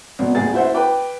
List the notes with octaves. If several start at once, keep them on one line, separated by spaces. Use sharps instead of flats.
G#1 B2
G#1 D#2 A2 G#4 A6
E4 F#4 C5 E5 F#5
B4 G5 D6